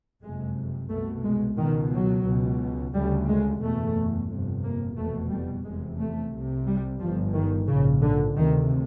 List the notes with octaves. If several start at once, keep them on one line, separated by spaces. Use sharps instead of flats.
F#1 F2 C3 G#3
C2 B2 A3
G#3
C#2 B2 D#3
F#3
C#2 B2
D2 C#3 G3
G#3
F#1 E2 B2 A3
G1 F2 C3
A#3
F1 E2 B2 A3
G3
F1 E2 C3 G#3
A3
C2 C3
G3
G1 G2 F3
D#3
A#1 G#2 C#3
D3
D2 C3 D#3